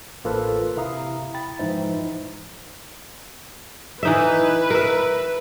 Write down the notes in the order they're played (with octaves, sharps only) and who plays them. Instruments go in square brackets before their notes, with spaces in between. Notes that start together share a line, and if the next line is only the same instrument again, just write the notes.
[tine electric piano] A1 A#3 F4 A4 B4 C5
C3 E4 E5 F5 A#5 D#6
G5 B5 A6
G#2 E3 F3 D#4 C5 E5
[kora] E3 D#4 E5 [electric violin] B4
[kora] A#4 E5